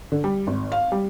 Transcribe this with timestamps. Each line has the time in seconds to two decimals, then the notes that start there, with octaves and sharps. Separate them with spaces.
0.12 D3
0.24 G3
0.47 G#1
0.72 F5
0.92 G3